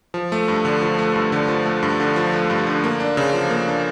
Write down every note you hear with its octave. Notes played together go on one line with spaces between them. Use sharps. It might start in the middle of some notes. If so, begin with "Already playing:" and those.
F3
A3
G2
D3
F3
A3
G2
D3
F3
A3
G2
D3
F3
A3
G2
D3
A#3
D4
C#3
F3
A#3
D4